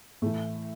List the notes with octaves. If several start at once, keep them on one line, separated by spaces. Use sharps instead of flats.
A2 E3 A3